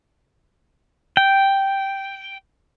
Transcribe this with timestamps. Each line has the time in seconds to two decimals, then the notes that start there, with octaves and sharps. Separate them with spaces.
1.17 G5